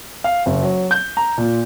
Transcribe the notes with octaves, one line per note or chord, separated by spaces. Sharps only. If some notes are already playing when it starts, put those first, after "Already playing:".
F5
F#1
F#3
G6
A#5
A#2